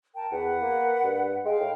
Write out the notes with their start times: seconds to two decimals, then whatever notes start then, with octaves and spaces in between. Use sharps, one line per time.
0.14 A#4 G5 A5
0.31 E2 B4 F#5
0.62 A#3
1.03 G2
1.45 G#3 F5 G5
1.60 A2